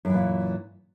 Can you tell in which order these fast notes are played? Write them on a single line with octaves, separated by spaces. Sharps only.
F#2 E3 A#2